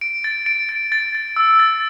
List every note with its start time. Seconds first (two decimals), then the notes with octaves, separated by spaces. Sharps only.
0.01 D7
0.24 A6
0.46 D7
0.69 A6
0.92 A6
1.15 A6
1.36 E6
1.60 A6